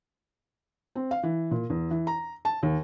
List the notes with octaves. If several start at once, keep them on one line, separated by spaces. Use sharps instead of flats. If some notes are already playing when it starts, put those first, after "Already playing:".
C4
F5
E3
A#2
E2
E3
A#5
A5
D#2